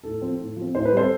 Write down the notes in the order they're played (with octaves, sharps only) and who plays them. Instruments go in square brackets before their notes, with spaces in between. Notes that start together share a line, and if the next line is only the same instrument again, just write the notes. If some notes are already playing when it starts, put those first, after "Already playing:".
[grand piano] A2 A4
F3 C4
A2
F3 C4
A2 C5
B4
G3 C4 A4 C5